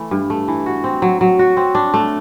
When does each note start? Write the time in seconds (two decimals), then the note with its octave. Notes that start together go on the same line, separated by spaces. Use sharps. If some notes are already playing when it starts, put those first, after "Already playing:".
Already playing: E3 A3
0.11 G2
0.30 A3
0.48 E3
0.66 F#4
0.84 C4
1.02 F#3
1.21 F#3
1.39 F#4
1.57 C4
1.75 D4
1.94 A3